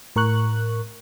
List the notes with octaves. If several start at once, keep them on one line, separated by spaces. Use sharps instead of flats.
A2 A#4 C#6 F#6